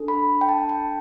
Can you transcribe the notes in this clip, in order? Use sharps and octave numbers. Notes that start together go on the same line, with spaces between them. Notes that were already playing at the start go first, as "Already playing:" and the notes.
Already playing: D4 A4
B5
G5
A5
G5